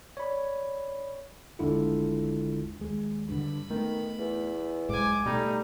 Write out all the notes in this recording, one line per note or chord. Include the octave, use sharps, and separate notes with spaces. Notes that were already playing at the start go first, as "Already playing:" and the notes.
C#5 D5 B5
G1 D#2 D3 G#3 E4 F4
D#2 G#3
G2 D3 B5
D#3 A3 B3
E2
B1 G#2 G#3 G#5 D6
B2 G3 A3 D#4